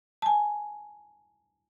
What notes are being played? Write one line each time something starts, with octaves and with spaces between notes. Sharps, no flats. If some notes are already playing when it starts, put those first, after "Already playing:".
G#5 A5